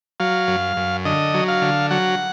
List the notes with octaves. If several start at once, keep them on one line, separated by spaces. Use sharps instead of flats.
F#3 F5
F#2
F#2
D3 D#5
F#3
F5
D3
F#3 F#5